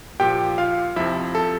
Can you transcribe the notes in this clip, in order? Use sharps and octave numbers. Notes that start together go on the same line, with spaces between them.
A#2 F3 G4 G5
F4 F5
F2 C3 F3 E4 E5
A4